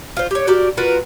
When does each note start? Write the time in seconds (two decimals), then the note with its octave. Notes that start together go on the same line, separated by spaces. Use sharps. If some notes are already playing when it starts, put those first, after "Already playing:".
0.17 F4 C5
0.31 G4 C#5
0.47 F#4 G4 A#4 D5
0.77 F4 F#4 A#4 B4